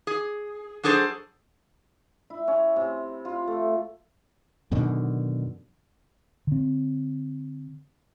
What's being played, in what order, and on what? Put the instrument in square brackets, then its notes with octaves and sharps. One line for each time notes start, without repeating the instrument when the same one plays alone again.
[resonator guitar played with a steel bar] G#4
F#3 D4 G#4 A4 C5
[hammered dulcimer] E4
C#4
C3
F4
A3
[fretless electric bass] F#2 B2 D3 D#3
D3 C4